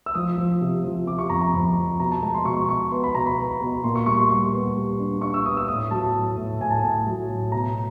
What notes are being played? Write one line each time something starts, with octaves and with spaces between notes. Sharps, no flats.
E6
F3 D#6
F3
C3
F3
C3 D6
C#6
F2 A#5
A#5
F2 B5
F3
B2 A#5
A5
G#3 A#5
C6
B2 C#6
B3 C#6
B3 C6
B5
B2 A#5
B5
B3
B2
A#2 C6
C#6
G3 C#6
C6
G3 C#6
B3
G3
D4
D4 C#6
E6
B3 D#6
E6
A2 D#6
F#3 A5
A2
A2
A2 G#5
A5
A2 G#5
F#3
A2
B2 A#5